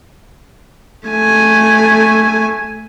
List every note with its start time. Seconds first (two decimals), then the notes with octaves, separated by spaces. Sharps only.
1.08 A3 G#5